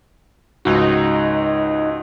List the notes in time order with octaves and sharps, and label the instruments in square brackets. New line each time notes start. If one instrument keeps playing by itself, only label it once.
[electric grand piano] C#2 G#2 F#4 [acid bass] D#4